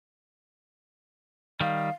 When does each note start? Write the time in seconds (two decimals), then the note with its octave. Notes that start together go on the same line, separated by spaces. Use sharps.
1.60 D#3 G3 F5